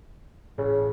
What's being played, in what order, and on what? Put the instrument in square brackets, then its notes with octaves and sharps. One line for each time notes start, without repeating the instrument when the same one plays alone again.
[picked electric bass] A1 [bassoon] C#3